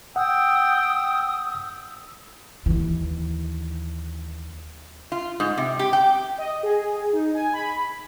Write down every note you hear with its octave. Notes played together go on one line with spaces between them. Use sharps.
F#5 G5 D#6 E6
D#2 E3
F4
G#2
C3
G4
G5
D#5
G#4
D#4
G#5
B5